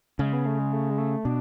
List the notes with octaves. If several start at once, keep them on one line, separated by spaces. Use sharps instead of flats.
C#3 G#3
B3
A3
G#3
A3
G#3
A3
B2 D4